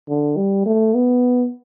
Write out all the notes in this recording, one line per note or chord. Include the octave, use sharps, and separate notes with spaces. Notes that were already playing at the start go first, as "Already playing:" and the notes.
D3
G3
A3
B3